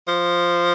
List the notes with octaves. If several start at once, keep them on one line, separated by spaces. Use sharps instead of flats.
F3